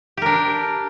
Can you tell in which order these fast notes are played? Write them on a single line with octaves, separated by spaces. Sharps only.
G4 A#4 D4